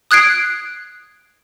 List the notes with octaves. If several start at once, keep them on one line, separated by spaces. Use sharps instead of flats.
D#6 F#6 G#6 C7 D7